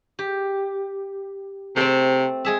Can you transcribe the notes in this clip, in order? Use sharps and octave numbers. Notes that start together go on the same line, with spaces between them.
G4
C3 A3 C4
G#3 G#4 E5